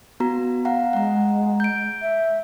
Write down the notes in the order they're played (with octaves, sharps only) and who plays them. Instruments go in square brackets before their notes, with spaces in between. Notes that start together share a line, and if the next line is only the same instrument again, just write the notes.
[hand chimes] B3 F#4 A#5
F5 F#5 A#5
[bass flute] G#3 [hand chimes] F#5 A#5
[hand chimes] G6 D7
[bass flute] E5